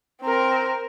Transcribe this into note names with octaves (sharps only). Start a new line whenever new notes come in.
C4 A#4